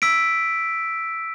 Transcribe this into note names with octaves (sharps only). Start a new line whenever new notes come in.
E6 B6 D7